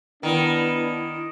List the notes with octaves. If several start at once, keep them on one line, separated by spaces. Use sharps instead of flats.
D#3 B3 D4 E4